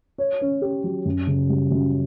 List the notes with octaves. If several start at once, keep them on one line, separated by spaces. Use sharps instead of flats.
C#5
C#4
G4
F#3
F#2
C#3
G3
F#2